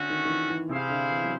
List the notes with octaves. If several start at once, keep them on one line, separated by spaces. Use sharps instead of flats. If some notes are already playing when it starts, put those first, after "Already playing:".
Already playing: D3 A3 C#4 F#4
D#3
D#3
E3
E3
C3 E4 G#4 C5 F5
D3
E3
F#3